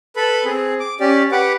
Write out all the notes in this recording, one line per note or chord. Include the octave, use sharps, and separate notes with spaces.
A4 B4 B5
C4 G#4
D6
C#4 G4 D5
G4 B4 F#5 D6